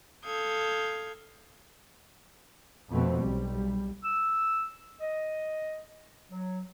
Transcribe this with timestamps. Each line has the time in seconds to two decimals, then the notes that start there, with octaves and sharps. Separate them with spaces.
0.24 A4 F5 D#6 G6 G#6
2.91 F2 B2 A3 B3 C4
3.20 B1 G3
4.03 E6
5.01 D#5
6.30 F#3